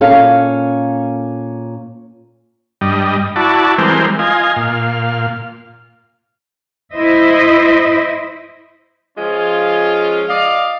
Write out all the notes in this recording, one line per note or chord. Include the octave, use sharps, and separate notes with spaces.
A#2 C#4 A4 F5
G2 G3 D#5
E4 F#4 D5 A5
E3 G3 G#3 C4 A#4 C5
F4 D#5 G#5
A#2 F5
E4 C5 D#5 E5
F3 G#3 C#4 F4
D5 D#5 F5